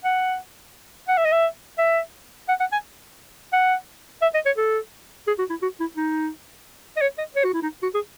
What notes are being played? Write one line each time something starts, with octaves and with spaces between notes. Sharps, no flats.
F#5
F#5
E5
D#5
E5
E5
F#5
F#5
G#5
F#5
E5
D#5
C#5
A4
G#4
F#4
E4
F#4
E4
D#4
D#5
C#5
D#5
C#5
F#4
E4
D#4
F#4
G#4